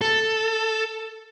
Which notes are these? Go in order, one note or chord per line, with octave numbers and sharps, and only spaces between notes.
A4